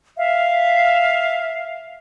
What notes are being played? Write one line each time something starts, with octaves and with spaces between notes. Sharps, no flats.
E5 F5